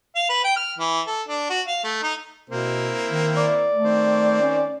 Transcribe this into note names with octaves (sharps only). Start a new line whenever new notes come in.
F5
B4
G5
F6
E3
A4
D4
F#4
F5
A3
D#4
B2 A#3 C4 E4
D#3
D5
A3
D#3 C4
C#4